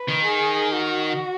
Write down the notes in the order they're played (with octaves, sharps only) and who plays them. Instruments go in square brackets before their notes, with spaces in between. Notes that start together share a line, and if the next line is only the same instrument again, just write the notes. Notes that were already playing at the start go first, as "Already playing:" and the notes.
Already playing: [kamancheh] B4
[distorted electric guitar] D#3
[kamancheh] G#4
F#4